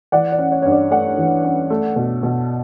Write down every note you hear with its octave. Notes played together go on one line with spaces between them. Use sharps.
E3 D5 F#5
D5
C#4
C#5
G2 C#5
D5
A3 D5 F#5
E3
C#4
A3
B2
B2